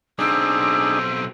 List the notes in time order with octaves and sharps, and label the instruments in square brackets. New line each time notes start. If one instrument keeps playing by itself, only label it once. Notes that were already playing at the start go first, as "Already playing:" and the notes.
[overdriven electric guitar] B1 C4 [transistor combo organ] D4 D#4 G#4 [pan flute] E6